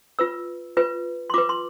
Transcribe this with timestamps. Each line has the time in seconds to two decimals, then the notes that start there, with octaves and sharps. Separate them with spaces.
0.19 F4 B4 E6
0.77 F4 B4
1.30 C6
1.34 F4 B4 D6
1.49 C6